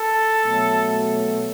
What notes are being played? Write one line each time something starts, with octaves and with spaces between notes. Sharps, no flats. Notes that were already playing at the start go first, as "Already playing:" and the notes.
Already playing: A4
B2 F#3 A3